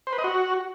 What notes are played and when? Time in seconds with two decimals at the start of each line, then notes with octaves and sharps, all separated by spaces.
0.07 C5
0.13 B4
0.18 D#5
0.24 F#4